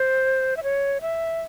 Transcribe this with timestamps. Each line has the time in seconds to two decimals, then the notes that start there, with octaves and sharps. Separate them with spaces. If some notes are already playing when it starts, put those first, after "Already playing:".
Already playing: C5
0.57 E5
0.63 C#5
1.01 E5